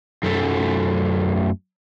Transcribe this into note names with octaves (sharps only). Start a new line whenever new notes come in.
F#2 A3